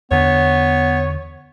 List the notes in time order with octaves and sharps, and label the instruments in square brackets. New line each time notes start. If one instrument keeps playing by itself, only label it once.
[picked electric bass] E2 D3 [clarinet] B3 [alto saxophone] C#5